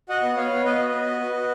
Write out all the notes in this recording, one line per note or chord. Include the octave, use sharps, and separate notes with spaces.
F#4 D#5 F#5
B3
B3 C#5 F5
B3
B3 B4 D#5
F#4
B3
F#4
F#4
F#4